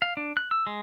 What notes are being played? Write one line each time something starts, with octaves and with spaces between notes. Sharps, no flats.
F5
D4
F#6
E6
G#3